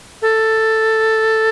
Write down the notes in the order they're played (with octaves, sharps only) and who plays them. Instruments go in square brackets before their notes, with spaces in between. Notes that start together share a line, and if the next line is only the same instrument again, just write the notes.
[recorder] A4